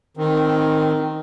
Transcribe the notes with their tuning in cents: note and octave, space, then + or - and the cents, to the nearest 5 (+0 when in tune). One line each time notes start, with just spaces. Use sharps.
D#3 +0 C4 +0